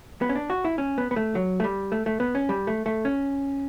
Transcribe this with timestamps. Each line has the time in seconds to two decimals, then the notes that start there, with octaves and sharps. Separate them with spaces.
0.22 B3
0.29 C#4
0.35 D4
0.50 F#4
0.65 E4
0.78 C#4
0.98 B3
1.11 B3
1.16 A3
1.35 F#3
1.60 A3
1.64 G3
1.92 A3
2.06 A3
2.20 B3
2.35 C#4
2.49 G3
2.67 A3
2.86 A3
3.05 C#4